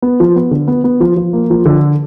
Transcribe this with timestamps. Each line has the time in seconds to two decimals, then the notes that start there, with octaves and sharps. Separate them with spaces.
0.02 B3
0.20 F3
0.36 B3
0.51 D3
0.68 B3
0.84 B3
1.00 F3
1.17 F3
1.33 A#3
1.50 F3
1.66 D3